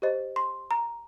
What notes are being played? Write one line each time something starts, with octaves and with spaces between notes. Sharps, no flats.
G4 C5 D#5
C6
A#5